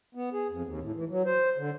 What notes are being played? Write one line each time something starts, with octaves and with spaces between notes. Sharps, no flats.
B3
G#4
F2
D#2
A2
E3
F#3
C5
D3